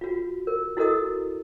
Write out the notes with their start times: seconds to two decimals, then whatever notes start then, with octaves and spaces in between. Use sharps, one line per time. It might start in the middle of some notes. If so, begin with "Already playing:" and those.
0.01 F4 F#4
0.47 A#4
0.77 E4 F#4 A4 A#4 D#5 D#6